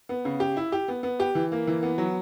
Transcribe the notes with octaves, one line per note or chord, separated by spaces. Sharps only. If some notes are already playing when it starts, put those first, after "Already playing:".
B3
C#3
G4
E4
G4
B3
B3
G4
E3
A#3
E3
B3
F#3